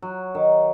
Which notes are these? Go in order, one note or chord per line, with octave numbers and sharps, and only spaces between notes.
F#3
D#3